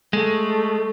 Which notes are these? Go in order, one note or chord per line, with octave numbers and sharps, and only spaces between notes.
G#3 A3